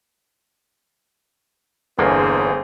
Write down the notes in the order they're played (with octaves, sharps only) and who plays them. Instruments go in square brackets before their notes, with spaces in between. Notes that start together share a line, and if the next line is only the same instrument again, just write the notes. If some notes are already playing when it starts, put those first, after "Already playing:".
[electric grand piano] G1 [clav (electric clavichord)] E2 D3 A#3 [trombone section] C4 C#4 [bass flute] G#4